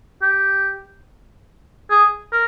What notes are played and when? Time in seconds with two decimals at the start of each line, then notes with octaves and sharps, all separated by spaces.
0.22 G4
1.90 G#4
2.32 A#4